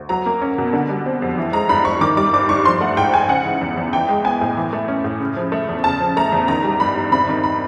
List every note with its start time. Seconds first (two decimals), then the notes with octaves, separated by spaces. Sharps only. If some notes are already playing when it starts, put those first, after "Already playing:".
Already playing: D2
0.09 F#3 A#5
0.26 A#3
0.42 C#4
0.58 B2
0.73 D3
0.89 G3
1.06 C4
1.22 F2
1.37 E3
1.53 G#3 A#5
1.69 G2 B5
1.85 G2 C#6
2.01 D#3 D6
2.17 G3 D6
2.33 G2 D6
2.49 G2 C#6
2.65 F3 C6
2.81 A3 F#5
2.96 G#2 G5
3.13 G#2 G#5
3.28 C#3 F#5
3.45 E3
3.61 E2
3.77 E2
3.93 E3 G5
4.09 G#3
4.24 B3 G#5
4.41 A2
4.57 E3
4.73 A3
4.88 C#4
5.04 A2
5.20 C#3
5.37 F3
5.52 A3
5.69 E2
5.84 C#3 A5
6.00 F3
6.17 A3 A#5
6.32 E2
6.48 D#3 A#5
6.64 G3
6.80 G2 B5
6.96 G2
7.12 C3 B5
7.29 D#3
7.44 B5